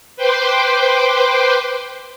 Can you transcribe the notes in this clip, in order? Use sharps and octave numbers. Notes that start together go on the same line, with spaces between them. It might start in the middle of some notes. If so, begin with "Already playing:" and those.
B4 C5 G5 C6 D6